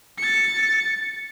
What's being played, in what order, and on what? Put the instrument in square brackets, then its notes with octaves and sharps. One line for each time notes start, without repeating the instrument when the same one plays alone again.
[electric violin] A6 C#7